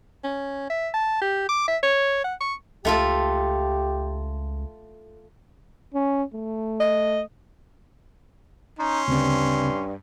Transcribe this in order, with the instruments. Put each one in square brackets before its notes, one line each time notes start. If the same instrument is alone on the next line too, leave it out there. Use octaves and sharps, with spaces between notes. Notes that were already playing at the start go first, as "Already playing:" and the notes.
[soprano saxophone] C#4
E5
A5
G4
D6
E5
C#5
F#5
C#6
[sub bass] C#2 [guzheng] A3 F4 A4 [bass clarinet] G4
[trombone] C#4
A3
[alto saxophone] D#5
[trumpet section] C#4 C6 [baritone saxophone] D#4
[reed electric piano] D2 C#3 C4 [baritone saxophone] G2